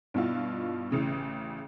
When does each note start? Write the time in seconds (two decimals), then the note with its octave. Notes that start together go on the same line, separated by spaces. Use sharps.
0.14 G2 B2 E4 F4
0.91 A1 C#3 E3